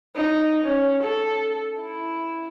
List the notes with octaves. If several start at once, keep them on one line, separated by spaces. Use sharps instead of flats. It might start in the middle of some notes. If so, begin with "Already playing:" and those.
D#4
C#4
A4
E4